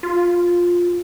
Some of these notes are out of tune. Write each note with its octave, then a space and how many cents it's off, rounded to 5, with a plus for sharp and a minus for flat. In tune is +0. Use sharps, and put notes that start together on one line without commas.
F4 +10